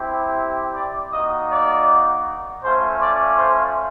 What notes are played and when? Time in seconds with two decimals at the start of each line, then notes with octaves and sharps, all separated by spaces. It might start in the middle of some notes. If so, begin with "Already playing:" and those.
Already playing: C4 E4 G4
0.74 D5 D6
1.12 A#3 D#4 F#4 D#5 D#6
1.50 D5 D6
2.62 A3 C#4 F4 C5 C6
3.00 D5 D6
3.38 C5 C6